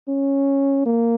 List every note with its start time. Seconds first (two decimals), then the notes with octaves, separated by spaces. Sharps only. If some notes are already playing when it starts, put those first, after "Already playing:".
0.09 C#4
0.86 A#3